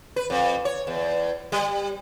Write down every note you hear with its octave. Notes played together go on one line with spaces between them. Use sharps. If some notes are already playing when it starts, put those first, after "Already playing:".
B4
F2
C#5
E2
G3